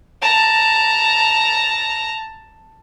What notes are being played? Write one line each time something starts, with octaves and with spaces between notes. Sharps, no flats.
A5 A#5